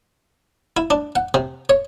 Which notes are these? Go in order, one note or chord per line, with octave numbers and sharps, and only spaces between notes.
E4
D4
F#5
C3
C#5